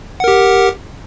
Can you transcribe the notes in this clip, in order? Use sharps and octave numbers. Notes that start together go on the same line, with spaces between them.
G4 A#4 F#5